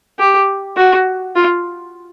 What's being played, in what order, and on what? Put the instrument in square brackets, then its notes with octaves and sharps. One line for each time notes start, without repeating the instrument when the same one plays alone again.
[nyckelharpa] G4
F#4
F4